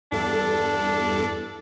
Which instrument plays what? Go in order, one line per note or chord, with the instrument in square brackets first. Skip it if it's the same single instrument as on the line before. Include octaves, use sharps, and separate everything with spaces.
[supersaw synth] E2 G2 A4 [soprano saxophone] D4